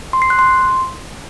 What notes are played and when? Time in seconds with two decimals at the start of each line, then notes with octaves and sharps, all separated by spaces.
0.13 C6
0.22 C7
0.30 F#6
0.39 C6